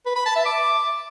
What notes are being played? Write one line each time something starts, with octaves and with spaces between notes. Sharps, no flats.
B4
B5
A5
E5
D6